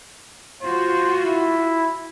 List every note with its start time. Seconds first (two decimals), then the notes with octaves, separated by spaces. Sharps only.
0.63 F4 F#4 C5
1.23 E4